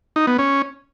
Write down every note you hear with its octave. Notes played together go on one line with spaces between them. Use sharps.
D#4
B3
C#4